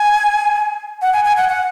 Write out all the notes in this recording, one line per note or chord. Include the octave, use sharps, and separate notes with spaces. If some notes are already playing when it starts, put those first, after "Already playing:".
Already playing: G#5
F#5
G#5
G#5
F#5
F#5